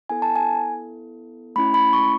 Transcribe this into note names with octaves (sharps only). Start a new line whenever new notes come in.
B3 E4 A4 G#5
A5
G#5
A3 C#4 E4 B5
B5
C#6